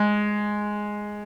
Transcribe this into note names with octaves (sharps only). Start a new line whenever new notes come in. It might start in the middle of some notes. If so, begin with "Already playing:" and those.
Already playing: G#3